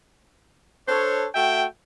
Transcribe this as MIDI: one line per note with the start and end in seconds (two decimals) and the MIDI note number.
0.88 1.25 62
0.88 1.25 69
0.88 1.25 72
0.88 1.25 73
1.34 1.64 57
1.34 1.64 66
1.34 1.64 76
1.34 1.64 79